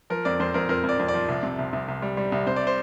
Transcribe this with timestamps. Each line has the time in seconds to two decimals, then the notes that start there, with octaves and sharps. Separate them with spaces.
0.10 F3 A#4
0.25 F2 D5
0.40 F2 C5
0.54 F2 A#4
0.69 F2 A#4
0.83 F2
0.89 D5
0.99 F2
1.08 D5
1.14 F3
1.28 C2
1.43 C3
1.59 C2
1.73 C2
1.88 C2
2.02 G3
2.17 G3
2.32 C2
2.47 C3 C5
2.56 D5
2.67 C5